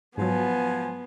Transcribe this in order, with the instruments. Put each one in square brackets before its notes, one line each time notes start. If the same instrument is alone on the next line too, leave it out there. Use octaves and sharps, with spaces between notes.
[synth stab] G#2 F#3 [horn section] F3 G#5 [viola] B3